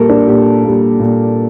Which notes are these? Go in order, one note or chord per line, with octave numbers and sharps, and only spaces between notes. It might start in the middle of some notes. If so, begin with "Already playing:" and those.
Already playing: A#2 G3 A#3 A4 A#4
D4
A#2 G4
G3 A#3
A#2